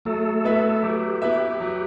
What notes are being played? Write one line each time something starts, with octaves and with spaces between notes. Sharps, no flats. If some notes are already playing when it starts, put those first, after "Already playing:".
F#3 A3 A4
B3 E4 B4 E5
F#3 G4
B3 E4 G4 B4 E5
F#3